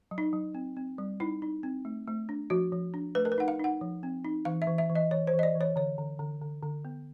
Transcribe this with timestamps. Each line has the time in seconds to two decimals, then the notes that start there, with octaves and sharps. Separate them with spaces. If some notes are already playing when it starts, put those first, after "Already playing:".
0.11 F#3
0.18 D#4
0.33 F#3
0.55 C4
0.77 C4
0.98 G3
1.20 D#4 E4
1.42 D#4
1.63 C4
1.85 A3
2.07 A3
2.29 D4
2.50 F3 F#4
2.72 F3
2.94 D4
3.15 A3 B4
3.25 A#4
3.32 B4
3.38 D#4 F#5
3.48 F5
3.60 D#4 F#5
3.81 F3
4.03 C4
4.25 D#4
4.45 E3 F5
4.62 E5
4.67 E3
4.78 E5
4.89 E3
4.95 D#5
5.11 E3 C#5
5.27 C5
5.33 E3
5.39 D#5
5.43 D5
5.55 E3
5.61 C#5
5.76 D3 C#5
5.98 D3
6.19 D3
6.41 D3
6.63 D3
6.85 B3